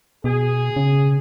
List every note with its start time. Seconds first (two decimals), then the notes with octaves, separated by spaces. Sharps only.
0.24 B2 G#4
0.76 C#3